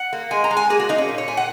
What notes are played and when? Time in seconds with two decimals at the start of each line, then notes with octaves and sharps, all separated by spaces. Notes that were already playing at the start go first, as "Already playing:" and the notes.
Already playing: F#5
0.13 A#3
0.31 G#3 G#5
0.44 A#5
0.51 G#3
0.57 G#5
0.70 A#3 G#4
0.80 F#4
0.89 A#3 D#4
0.98 C#4
1.09 A#2
1.18 C#5
1.28 A#2 G#5
1.37 F#5